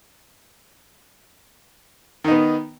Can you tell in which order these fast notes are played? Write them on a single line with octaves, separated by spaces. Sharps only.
D#3 D#4 B3